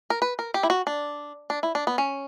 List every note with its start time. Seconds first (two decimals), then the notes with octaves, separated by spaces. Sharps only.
0.10 A#4
0.22 B4
0.39 A#4
0.54 G4
0.63 E4
0.70 F#4
0.87 D4
1.50 D4
1.63 E4
1.75 D4
1.87 B3
1.98 C#4